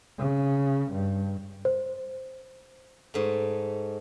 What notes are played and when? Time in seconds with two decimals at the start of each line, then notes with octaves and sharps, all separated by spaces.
0.18 C#3
0.92 G2
1.65 C5
3.14 G#2 A3